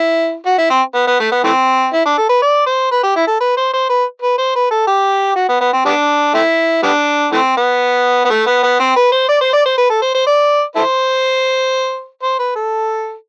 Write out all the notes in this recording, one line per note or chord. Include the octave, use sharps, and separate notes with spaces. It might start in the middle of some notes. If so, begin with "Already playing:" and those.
Already playing: E4
F#4
E4
C4
B3
B3
A3
B3
E3 A3 C4
E4
D4
A4
B4
D5
C5
B4
G4
E4
A4
B4
C5
C5
B4
B4
C5
B4
A4
G4
F#4
B3
B3
C4
G3 B3 D4
A3 C4 E4
G3 B3 D4
E3 A3 C4
B3
B3
A3
B3
B3
C4
B4
C5
D5
C5
D5
C5
B4
A4
C5
C5
D5
E4 A4 C5
C5
B4
A4